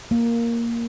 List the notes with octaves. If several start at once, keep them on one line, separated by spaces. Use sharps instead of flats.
A#3